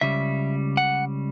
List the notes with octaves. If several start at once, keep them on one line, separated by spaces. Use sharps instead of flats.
C#2 C#3 G3 E5
F#5